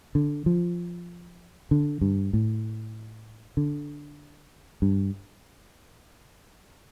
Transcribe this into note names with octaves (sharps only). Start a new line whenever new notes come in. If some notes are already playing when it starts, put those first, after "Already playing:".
D3
F3
D3
G2
A2
D3
G2